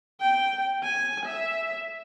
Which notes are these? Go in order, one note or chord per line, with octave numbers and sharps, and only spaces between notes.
G5
G#5
E5